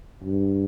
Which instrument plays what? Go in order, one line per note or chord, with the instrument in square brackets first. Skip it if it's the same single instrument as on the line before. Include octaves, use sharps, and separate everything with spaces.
[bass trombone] G2